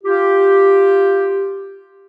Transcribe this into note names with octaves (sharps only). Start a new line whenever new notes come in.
F4 G4